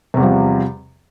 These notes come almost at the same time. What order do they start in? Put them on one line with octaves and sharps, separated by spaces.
C3 E2 G3 F3